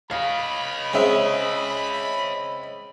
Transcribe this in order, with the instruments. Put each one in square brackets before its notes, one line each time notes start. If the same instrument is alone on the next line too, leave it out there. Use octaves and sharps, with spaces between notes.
[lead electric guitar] C#5 D#5 [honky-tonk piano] F5 [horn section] B5
[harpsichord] G#3 [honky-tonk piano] C4 C#4 E5